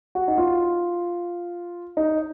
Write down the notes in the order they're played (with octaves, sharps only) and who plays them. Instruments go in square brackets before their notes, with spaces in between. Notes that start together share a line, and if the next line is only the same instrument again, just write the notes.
[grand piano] F#4
D#4
F4
D#4